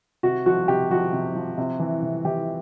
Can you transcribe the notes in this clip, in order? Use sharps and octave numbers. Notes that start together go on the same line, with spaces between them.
C3 F#4
F3 F#4
C3 G4
F3 F#4
C3
F3
C3
E3
C3
E3 G4